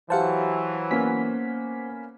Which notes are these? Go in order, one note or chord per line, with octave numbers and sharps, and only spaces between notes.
E3 F#3 G4 C5 F5 F#5 A5
A#3 B3 C#4 B6